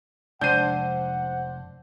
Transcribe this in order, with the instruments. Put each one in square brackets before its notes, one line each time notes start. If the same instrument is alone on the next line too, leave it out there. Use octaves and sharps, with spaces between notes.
[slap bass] F1 G#3 [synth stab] D4 C5 [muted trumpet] F#5 [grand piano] G6 D#7